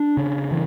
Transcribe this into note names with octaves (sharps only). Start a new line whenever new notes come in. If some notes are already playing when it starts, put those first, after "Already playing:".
Already playing: D4
C#3
E3